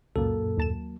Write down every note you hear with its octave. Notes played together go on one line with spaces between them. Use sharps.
C#2 F#2 A#2 F#3 A#3 A4
D#2 A5 E7